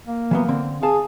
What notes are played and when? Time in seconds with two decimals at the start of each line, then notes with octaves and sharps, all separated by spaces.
0.06 A#3
0.31 E3 F#3 B3
0.48 D3 C4
0.83 G#4 F5 A5